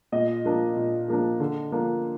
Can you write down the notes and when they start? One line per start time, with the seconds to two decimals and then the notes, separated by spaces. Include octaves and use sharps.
0.12 A#2 D#5
0.44 F3 A#3 D4
0.77 A#2
1.08 F3 A#3 D4
1.40 D3
1.72 F3 A#3 D4